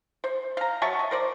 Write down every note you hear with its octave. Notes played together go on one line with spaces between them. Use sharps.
C5
F5 A#5
F#3 E5 A5 C#6
D#5
A#4 C5 D5